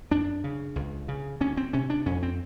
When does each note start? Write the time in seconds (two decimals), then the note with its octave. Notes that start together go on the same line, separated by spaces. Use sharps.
0.11 F#2 D4
0.44 C#3
0.76 C#2
1.08 C#3
1.41 D2 C#4
1.57 C4
1.73 C3 C#4
1.90 D4
2.06 F2 C#4
2.23 C4